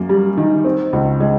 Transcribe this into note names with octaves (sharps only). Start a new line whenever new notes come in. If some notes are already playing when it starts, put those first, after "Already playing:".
Already playing: F#2 A#3
G3
D#3
C4
C#2
G#3